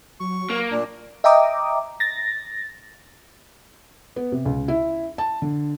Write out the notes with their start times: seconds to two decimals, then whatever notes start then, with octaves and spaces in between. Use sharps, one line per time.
0.20 F#3 C#6
0.50 A#3
0.71 A#2 D4
1.24 D#5 E5 G5 A#5 D6 D#6
2.00 A6 A#6
4.16 B3
4.32 C3
4.45 C#2
4.68 E4
5.18 A5
5.42 D3